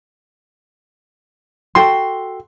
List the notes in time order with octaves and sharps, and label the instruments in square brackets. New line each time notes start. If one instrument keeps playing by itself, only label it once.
[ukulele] F#4 A4 G5 [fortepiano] C6